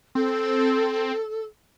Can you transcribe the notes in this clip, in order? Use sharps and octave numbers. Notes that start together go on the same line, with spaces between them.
C4 A4